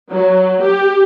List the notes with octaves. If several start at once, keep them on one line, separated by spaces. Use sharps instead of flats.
F#3
G4